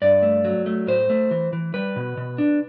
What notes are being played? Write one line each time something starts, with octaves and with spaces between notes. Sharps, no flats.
G2 D5
A3
F#3
A3
A2 C5
A3
E3
E3
G3 B4
B2
B2
D4